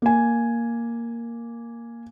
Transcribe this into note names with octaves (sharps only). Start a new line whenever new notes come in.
A#3 G#5